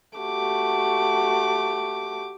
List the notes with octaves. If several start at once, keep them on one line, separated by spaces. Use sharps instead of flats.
A3 F#4 G4 D6